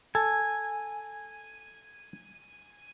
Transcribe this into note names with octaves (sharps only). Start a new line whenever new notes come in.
A4 G#5